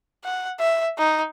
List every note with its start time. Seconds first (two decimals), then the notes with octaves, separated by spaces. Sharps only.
0.24 F#5
0.59 E5
0.98 D#4